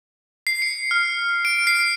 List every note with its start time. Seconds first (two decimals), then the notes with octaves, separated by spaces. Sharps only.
0.47 C7
0.62 C#7
0.91 F6
1.45 D7
1.67 C7